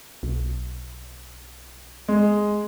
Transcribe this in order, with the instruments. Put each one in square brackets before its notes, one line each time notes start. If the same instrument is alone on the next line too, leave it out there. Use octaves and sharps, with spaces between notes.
[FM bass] B1
[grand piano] G#3